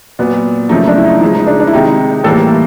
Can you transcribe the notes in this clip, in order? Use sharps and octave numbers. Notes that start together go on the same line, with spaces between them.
A#2 F#3 B3
F#2 C#3 F3 A3 D#4
D4
E4
D#4
C#3 F3 G#3 E4
D#4
D4
D4
E4
C3 D#3 G#3 D#4
A2 E3 G3 A#3 A4